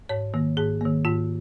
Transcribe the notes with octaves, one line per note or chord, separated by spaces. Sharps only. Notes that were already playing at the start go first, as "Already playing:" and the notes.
G#2 C#5
D#3 A#3
G#2 G#4
D#3 A#3
G#2 F4